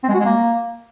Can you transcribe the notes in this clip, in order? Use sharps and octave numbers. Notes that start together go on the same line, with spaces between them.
C4
G#3
F#4
G#3
A#3